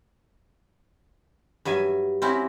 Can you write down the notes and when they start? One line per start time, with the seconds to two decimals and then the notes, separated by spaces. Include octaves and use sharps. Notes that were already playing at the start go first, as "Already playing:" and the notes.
1.65 G2 F#3 E5 G#5
2.22 C4 C#4 E4 F#4 G4